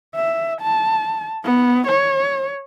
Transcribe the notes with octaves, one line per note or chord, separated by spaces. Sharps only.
E5
A5
B3
C#5